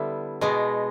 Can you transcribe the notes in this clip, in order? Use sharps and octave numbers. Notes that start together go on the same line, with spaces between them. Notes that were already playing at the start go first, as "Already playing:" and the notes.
Already playing: D3 G3 B3 E4
B2 G#3 B3